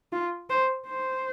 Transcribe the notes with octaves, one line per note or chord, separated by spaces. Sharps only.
F4
C5
C5